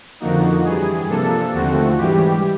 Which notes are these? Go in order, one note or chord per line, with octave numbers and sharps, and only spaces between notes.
F2 D3 F3 A#3 D#4 F#4
G2 E3 G3 G#4
C3 F3 A#3 D4 A4
D#2 D3 F3 A3 C4 F#4
G#2 E3 G3 G4